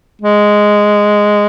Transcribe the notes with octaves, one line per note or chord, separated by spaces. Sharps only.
G#3